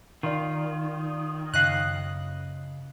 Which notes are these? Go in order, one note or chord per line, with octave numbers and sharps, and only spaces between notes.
D#3 F4 D5 F5 F6
F#2 C#3 D#5 F5 D#6 F#6